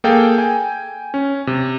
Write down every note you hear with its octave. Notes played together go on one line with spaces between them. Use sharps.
A#3 G#4 A4 F5 G5
G5 G#5
C#4
C3